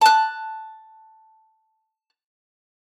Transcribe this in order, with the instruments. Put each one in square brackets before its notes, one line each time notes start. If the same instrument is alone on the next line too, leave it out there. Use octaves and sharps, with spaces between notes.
[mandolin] A5 F#6